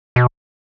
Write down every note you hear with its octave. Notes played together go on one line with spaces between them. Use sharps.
B2